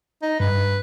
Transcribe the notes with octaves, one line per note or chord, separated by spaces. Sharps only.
D#4
G2 B4